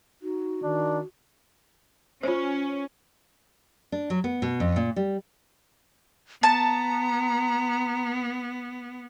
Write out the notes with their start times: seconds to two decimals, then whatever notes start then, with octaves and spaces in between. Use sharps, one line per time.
0.22 D#4 F#4
0.63 D#3 D4
2.23 C#4 F4 C5
3.92 D4
4.10 F#3
4.24 B3
4.42 B2
4.60 F2
4.76 A#2
4.96 G3
6.43 B3 A5 A#5